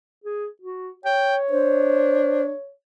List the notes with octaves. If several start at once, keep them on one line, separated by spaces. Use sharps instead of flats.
G#4
F#4
C#5 G5
D4 C5